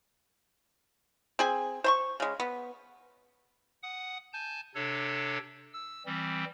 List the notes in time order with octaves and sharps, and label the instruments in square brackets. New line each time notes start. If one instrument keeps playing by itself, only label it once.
[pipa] C4 G#4 G#5
C5 C6 C#6
C#3 G#3
B3
[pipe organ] F#5 D#6
G#5 A5 G6
C3 D4 A4 C#5
E6
E3 G3 C4